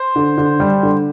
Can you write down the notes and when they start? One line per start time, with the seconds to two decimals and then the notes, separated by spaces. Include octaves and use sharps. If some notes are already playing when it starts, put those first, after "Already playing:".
Already playing: C5
0.16 D3
0.38 D3
0.60 G3
0.83 D3